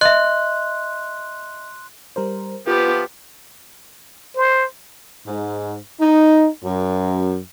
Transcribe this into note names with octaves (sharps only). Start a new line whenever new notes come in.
D#5 E5 C6 F#6
G3 A#4 C5
F3 B3 F4 G4 B4
C5
G#2
D#4
F#2